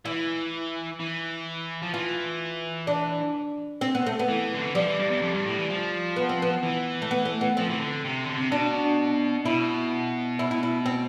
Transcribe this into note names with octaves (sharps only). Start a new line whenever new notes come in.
E3 E4
E3
F3
E3 F4
D4
C4
B3
A3
B3
E3
D3
E3
F3 G3
E3
G2
E2
F2
G2
A2
E3
F3
B3
C4
B3
E3
A3
B3
A3
B3
F3 C4
E3
D3
C3
D3
C3
B2 D4
B2 E4
E4
E4
E4
C4